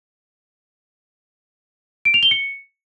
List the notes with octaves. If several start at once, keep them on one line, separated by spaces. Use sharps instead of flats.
D7
F7
G7
C#7